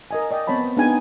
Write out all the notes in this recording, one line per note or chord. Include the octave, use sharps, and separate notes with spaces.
A#4 D#5 G#5
D5 D#5 G5
B3 C4 C#5 A5 B5
B3 D4 D#4 G#4 G5 G#5